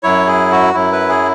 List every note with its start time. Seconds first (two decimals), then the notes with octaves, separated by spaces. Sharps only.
0.03 F#2 F#3 E4 C#5
0.27 G#4
0.51 F#4
0.74 F#2 F#3 E4
0.92 B4
1.09 G#4